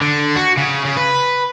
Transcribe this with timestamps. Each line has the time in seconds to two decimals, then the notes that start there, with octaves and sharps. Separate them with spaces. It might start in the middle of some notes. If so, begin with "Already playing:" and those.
0.02 D3
0.36 F#4
0.57 C#3
0.85 C#3
0.97 B4